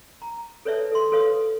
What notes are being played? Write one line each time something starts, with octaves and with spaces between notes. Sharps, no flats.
A#5
A4 B4 C#5 D5 E5 A5
A4 C6
A4 B4 C#5 F5 C6 D#6